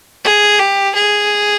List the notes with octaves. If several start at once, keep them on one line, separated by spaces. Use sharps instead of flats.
G#4
G4
G#4